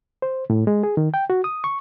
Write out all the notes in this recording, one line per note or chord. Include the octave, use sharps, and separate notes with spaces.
C5
A2
G#3
G#4
D#3
G5
F#4
D#6
C#6